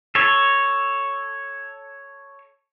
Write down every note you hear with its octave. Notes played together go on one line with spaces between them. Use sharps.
A4 C#5